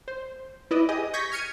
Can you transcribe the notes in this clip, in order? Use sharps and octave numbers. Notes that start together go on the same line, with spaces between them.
C5
E4 B4 D5 D#5
G4 G#4 D#5
C#6 G6 G#6 A#6 B6
F6 G#6 C#7 D#7